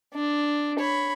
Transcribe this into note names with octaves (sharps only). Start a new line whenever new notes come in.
D4
C#5 B5